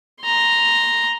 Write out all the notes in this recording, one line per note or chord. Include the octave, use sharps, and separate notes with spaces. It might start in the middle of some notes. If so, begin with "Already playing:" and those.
A#5 C6